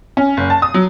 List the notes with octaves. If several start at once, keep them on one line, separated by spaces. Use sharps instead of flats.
C#4
F#1
A5
D#6
F#3